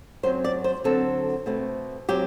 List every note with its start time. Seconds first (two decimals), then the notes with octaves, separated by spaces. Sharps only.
0.23 F#2 F#3 C4 C5
0.44 D5
0.64 C5
0.84 D3 F#3 C4 A4
1.46 B2 A3 C4
2.09 F#3 C4 G4